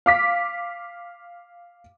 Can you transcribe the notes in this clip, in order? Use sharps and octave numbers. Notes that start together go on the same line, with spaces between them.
F5 D6 B6